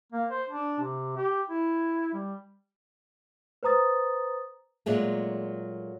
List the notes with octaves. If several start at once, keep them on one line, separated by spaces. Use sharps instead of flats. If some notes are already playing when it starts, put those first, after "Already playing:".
A#3
C5
D4
C3
G4
E4
G3
B4 C5 A#5 D#6 A6
A#2 F#3 G#3 A3